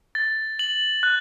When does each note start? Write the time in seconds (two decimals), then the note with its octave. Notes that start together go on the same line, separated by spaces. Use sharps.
0.15 A6
0.59 F#7
1.03 F#6